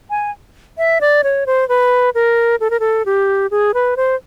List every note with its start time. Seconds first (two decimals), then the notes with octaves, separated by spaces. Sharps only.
0.10 G#5
0.78 E5
1.01 D5
1.24 C#5
1.46 C5
1.69 B4
2.15 A#4
2.60 A4
2.70 A#4
2.80 A4
3.06 G4
3.51 G#4
3.74 B4
3.97 C5